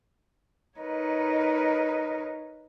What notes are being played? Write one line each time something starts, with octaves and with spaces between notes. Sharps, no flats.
D#4 A#4 B4 C#5 D#5